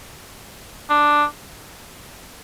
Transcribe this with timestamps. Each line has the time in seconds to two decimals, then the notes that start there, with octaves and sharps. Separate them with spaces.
0.89 D4